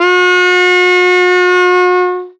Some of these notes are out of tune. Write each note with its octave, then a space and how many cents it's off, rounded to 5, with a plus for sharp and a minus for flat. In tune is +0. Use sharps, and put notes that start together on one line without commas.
F#4 -40